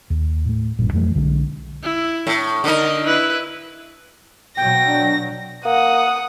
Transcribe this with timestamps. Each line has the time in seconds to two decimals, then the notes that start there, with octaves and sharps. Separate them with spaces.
0.10 D#2
0.45 A2 A3
0.79 D#1 A1 G2 A#2
0.93 F2 E3 F#3 A3
1.16 B1 D3 G#3
1.83 E4
2.27 A2
2.64 D3 D#4 A#4 D#5
3.04 E4 B4
4.57 B2 F#3 G5 A#6
4.87 D4
5.65 A#3 F#5 D#6